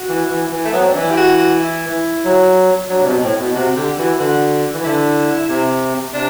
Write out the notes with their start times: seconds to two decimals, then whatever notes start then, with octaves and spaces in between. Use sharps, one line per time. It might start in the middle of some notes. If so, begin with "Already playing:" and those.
Already playing: F#4
0.09 E3
0.31 E3
0.52 E3
0.65 A3
0.73 F#3 B3
0.80 C4
0.88 D4
0.95 E3 E4
1.10 G4
1.17 F#4
1.38 F#4
1.60 E4
2.25 F#3
2.89 F#3 D4
3.02 C3
3.05 B2 C4
3.22 A2 C4
3.38 B2 E4
3.54 C3 F#4
3.76 D3 G4
3.97 E3 F#4
4.19 D3 F#4
4.74 E3
4.84 D3 E4
5.48 C3
6.14 C3 D4